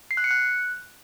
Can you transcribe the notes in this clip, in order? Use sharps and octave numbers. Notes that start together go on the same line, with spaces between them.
C7
F#6
C#7
F#6